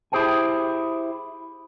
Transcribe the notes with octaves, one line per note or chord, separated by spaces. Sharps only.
E4 G4 G#4 C5 G5 G#5